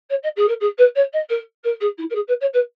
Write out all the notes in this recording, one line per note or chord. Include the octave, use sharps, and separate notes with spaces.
C#5
D#5
G#4
A#4
G#4
B4
C#5
D#5
A#4
A#4
G#4
E4
A#4
G#4
B4
C#5
B4